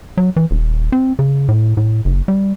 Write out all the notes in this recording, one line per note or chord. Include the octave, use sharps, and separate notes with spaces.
F#3
E3
D#1
C4
C#3
A2
A2
F#1
G3